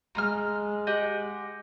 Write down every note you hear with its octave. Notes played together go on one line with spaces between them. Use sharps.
G#3 A#5 C6 F6
G4 D#5 F#5